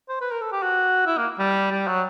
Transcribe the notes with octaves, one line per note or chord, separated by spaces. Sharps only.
C5
B4
A#4
A4
G4
F#4
E4
A#3
G3
G3
F#3